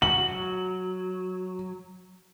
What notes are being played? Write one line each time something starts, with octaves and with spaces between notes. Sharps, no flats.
F#4 F#7
F#3